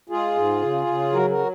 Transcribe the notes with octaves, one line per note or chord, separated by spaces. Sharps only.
G#3 F4 G#4
G#2
C#3
C#3
F#3 F#4 A#4
F#4 A#4
F#3